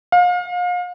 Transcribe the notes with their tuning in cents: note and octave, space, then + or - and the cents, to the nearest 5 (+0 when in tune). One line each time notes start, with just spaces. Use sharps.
F5 +35